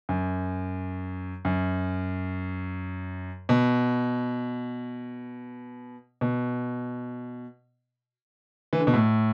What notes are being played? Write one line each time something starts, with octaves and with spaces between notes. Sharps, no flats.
F#2
F#2
B2
B2
E3
D3
B2
A2